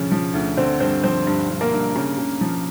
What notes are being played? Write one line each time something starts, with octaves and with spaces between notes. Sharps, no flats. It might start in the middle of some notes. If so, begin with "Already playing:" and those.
Already playing: D2 C#3 F3
F3
D2
D3 C4 C5
G2 C4 C5
F3 C4 C5
G2
G2
A#3 A#4
G2
C#3
C#3
F3